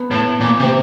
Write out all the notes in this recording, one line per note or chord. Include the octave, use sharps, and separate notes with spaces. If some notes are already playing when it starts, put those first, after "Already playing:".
Already playing: B3
A2
A#2
C3 C4